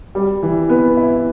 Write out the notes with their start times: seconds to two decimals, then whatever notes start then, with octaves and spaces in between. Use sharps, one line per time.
0.15 G3
0.43 E3
0.69 B3
0.97 E4